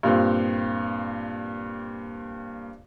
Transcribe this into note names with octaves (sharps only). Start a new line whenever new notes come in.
G2 A#2 C4